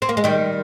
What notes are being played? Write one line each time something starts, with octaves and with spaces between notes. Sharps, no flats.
C4
A#3
G#3
D#3 G3